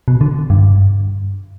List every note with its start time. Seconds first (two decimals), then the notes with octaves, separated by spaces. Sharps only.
0.08 B2
0.21 D3
0.50 G2